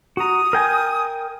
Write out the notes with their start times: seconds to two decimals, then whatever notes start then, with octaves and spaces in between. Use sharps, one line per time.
0.17 F#4 A#5 D#6
0.53 A#4 G5 G#5